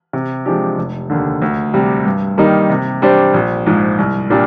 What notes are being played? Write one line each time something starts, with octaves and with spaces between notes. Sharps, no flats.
C3
F3 G#3 D4 G4
F1
D#2 D3
D2
C3 G3
G2
D#3 G3 A#3 D#4
C3
G3 D4 G4 C5
A#1
G#2 F3
C2
A#2 G3 D4